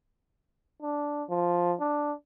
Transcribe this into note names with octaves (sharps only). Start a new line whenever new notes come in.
D4
F3
D4